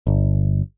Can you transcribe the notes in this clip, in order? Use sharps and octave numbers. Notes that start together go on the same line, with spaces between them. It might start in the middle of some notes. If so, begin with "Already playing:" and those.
G1